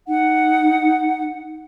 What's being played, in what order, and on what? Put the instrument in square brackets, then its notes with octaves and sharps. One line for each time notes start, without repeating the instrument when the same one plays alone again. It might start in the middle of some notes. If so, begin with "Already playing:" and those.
[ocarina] D#4 [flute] F#5